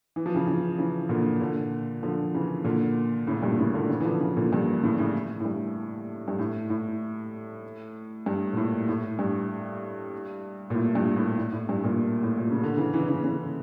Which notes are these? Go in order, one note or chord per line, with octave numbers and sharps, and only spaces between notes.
E3
F3
C#3 E3
C#3 E3
C#3 E3
A#2 D3
A#2 D3
D3 F3
C#3 E3
A#2 D3
A2 C#3
G2 A#2
A2 C#3
A#2 D3
C#3 E3
E3
D3 F3
C#3 E3
A#2 D3
G2 A#2
A2 C#3
A2 C#3
A2
G2
G2
A2
A2
G2
A#2
A2
A2
G2
A#2
A2
G2 A#2
A2
A2
A2
G2
G2 A#2
A2
A#2
C#3
D3
C#3 E3
C#3 E3
C#3 E3
C#3 E3